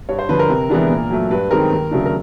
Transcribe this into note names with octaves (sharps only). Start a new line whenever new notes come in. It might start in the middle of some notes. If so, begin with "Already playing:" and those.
G2 C#5
C5
D3 F3 B4
A#4
C3
E3 G#3 B3 D4
A#2
F#3 A3
G2 B4
D#3 G#3 C4 D#4 A#4
D#2
C#3 F#3 A3 D4
A#4